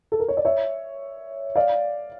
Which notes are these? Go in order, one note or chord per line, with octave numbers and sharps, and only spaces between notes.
A4
A#4
C#5
D5
C#5 E5
D5 F5